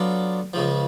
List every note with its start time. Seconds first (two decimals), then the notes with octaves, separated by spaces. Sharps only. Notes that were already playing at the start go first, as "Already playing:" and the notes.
Already playing: F#3 B3 D4 F4 A4
0.53 C#2 C#3 F3